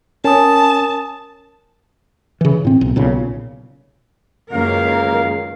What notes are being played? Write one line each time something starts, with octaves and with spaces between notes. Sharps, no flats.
C#4 A#4 G#5 A5 D#6
C#3 E3
A2 C4
B1
B1 A#2 C#3
C#2 F#2 D#3 A#3 A#4 F5